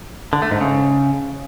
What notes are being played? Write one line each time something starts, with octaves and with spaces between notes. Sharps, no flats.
D3
A3
G#2
C#3